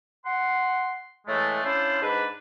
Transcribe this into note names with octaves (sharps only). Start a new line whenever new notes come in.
F#5 C6
A2 E3 G#3 A3
C#4 D4 E4 F4 C5
G#2 D4 B4